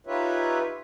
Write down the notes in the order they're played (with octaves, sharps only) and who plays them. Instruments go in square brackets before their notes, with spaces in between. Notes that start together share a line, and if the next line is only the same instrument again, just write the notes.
[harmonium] D#4 F4 G4 B4 C#5 E5